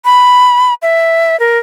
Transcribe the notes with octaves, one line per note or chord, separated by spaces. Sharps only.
B5
E5
A#4